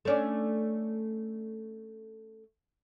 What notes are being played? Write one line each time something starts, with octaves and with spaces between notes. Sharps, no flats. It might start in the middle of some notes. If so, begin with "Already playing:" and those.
A3 C#4 D4